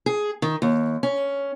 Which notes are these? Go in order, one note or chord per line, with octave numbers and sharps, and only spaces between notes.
G#4
D#3
D#2
C#4